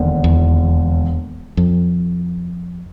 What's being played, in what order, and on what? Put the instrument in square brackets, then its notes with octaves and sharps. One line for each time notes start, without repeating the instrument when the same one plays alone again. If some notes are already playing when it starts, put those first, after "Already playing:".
Already playing: [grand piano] E1 D#2 D3
[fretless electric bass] E2
F2